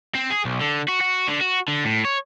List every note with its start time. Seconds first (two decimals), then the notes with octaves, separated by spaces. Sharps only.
0.15 C4
0.30 G#4
0.45 B1
0.61 D3
0.88 F#4
1.00 F#4
1.28 D3
1.41 F#4
1.68 D3
1.85 A2
2.05 C#5